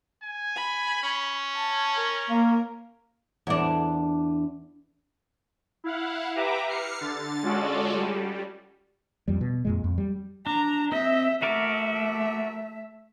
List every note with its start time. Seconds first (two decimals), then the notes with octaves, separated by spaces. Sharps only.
0.23 G#5
0.56 B5
1.03 C#4
1.55 A5
1.95 A#4
2.30 A#3
3.47 E2 D4
5.84 E4 F5 F#5
6.36 G4 B4 E5 A#5 D6
6.68 F6 C7 C#7
7.01 D3 A6
7.43 G#3 C#4 F4 F#4 A4 D5
7.94 G3
9.28 F2 G3
9.41 B2
9.65 F2 A#2 G#3
9.84 F2
9.98 G3
10.47 D4 A#5
10.92 C4 D#5 E5
11.42 A3 F#4 A#4 D5 E5